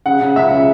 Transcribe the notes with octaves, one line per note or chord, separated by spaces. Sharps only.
C#3 F#5
C#3
C#2 E5
C#3